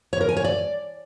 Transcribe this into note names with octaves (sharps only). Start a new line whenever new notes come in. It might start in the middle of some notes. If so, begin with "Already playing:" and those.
C#5
A#4
G#5
C#5
D5